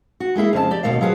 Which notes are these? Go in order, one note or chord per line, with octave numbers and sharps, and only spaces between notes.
F#4
G#3 A#3 E4 G#4
F2 C#3 A#4 A5
G4 D5
D#2 B2 F3 A3 A#4 F5
F#3 D4 F4 G#4 B4 C5